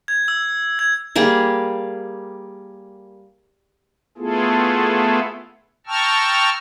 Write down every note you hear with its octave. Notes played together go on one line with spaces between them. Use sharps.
G#6
E6
G#6
G3 A#3 G#4
A3 B3 E4 F4 G#4 A4
G5 A5 A#5 C#6 E6 F6